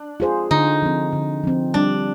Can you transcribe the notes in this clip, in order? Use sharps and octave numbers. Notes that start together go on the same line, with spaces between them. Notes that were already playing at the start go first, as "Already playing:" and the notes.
Already playing: D4
F4 G#4 C5
D3 D#4
F3 C4
D3
F3 C4
G3 D4